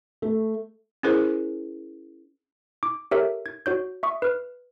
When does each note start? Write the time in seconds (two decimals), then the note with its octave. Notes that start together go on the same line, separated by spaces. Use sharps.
0.22 A3
1.03 C#4 E4 G#4 A#4 C5
2.83 D6
3.11 G4 A4 A#4 C#5 E5
3.46 G#6
3.66 F#4 C#5 G6
4.03 E5 C#6 D#6
4.22 B4 F6